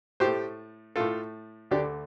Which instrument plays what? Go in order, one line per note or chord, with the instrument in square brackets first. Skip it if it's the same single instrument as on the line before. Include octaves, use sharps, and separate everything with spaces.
[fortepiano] A2 A3 G4 C5
A2 A3 F4 A4
D2 D3 A3 D4 G4